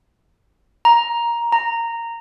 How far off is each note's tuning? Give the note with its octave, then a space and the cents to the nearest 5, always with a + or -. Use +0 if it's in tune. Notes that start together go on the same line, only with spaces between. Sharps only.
A#5 +10
A#5 -10